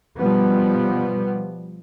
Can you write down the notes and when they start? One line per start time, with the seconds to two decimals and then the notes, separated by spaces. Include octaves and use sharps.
0.17 B2 F3 G3 B3